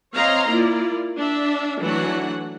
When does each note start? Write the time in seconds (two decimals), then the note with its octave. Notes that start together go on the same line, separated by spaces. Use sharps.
0.15 C4 C#5 D#5 F5 A#5 C6
0.49 A#3 E4 F4 D5
1.18 D4 E5
1.81 E3 F#3 A3 D4 F#4 F#5